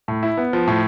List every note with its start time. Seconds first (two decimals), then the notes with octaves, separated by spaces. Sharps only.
0.08 A2
0.23 E4
0.37 B3
0.53 F3
0.67 A2